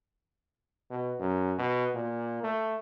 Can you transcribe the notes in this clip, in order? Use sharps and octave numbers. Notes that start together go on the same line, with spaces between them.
B2
F#2
B2
A#2
A3